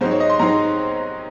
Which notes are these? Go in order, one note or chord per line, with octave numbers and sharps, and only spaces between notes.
G#2 F#3 C4 D#4 C5
C#5
D#5
C6
G#2 F#3 C4 D#4 A#5